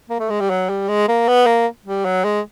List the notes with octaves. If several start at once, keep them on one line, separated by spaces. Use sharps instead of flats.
A#3
A3
G#3
G3
F#3
G3
G#3
A#3
B3
A#3
G3
F#3
G#3